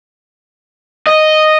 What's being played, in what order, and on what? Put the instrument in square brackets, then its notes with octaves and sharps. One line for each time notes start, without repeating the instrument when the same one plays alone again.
[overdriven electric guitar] D#5